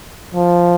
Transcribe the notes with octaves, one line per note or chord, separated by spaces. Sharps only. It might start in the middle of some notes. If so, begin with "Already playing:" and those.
F3